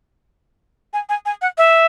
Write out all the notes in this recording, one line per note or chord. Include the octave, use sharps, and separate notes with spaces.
G#5
G#5
G#5
F#5
E5